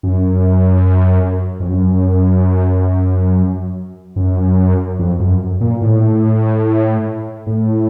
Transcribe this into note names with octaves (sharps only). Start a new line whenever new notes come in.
F#2
F2
F#2
F#2
F2
F#2
A#2
A2
A2